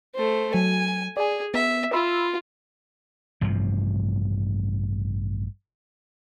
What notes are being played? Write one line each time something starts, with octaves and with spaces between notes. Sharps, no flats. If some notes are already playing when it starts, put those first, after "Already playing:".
A3 C5
F#3 G#5
G#4 D5 G#5
B3 E5
F4 B5 C6 E6
A1 G2 C3 F3